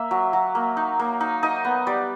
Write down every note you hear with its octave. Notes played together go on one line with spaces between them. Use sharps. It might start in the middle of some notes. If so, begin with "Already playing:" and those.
Already playing: A#3 E5
F#3
F#3
A#3
D#4
A#3
D#4
D#4 D#5
B3
G3 D5